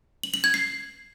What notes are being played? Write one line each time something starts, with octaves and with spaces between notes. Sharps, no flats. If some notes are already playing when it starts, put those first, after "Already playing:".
F#7
F#7
G#6
C7